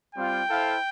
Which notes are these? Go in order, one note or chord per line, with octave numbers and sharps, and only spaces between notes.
G3 C4 F4 G5
E4 A4 C5 F5